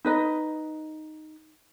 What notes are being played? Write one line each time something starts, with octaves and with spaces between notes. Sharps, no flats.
D#4 B4 D#5